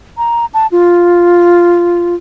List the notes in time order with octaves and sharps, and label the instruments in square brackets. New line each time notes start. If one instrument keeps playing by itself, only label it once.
[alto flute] A#5
A5
F4